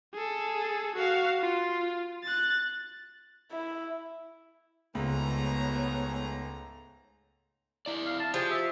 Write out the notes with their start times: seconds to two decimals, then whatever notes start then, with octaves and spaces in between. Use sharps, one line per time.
0.14 G#4 A4
0.95 F#4 F5
1.40 F4
2.24 F#6 A6
3.51 E4
4.95 C#2 G#2 A3 B3 C#5 A#5
7.86 E4 D5
8.06 F5
8.20 A5
8.34 F3 G4 G#4
8.51 E5